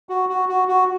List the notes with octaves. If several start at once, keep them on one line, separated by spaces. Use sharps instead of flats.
F#4
F#4
F#4
F#4